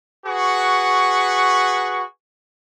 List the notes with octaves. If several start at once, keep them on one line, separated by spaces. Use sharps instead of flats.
F#4 G#4 B4 C#6